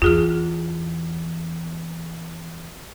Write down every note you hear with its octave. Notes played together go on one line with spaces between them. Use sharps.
E2 F4 G#4 F6